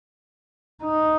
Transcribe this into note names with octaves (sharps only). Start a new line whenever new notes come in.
D#4